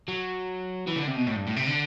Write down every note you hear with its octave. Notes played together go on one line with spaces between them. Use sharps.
F#3
E3
D3
C3
B2
A2
G2
A2
C3
D3